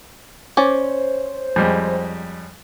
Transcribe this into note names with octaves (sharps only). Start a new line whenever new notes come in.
C#4 C5 D5
F2 G3 G#3